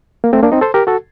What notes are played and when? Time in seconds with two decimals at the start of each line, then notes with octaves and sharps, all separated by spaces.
0.24 A#3
0.33 A3 C4
0.43 A#3 D4
0.52 C4 D#4
0.61 A4 C5
0.74 G4 A#4
0.87 F#4 A4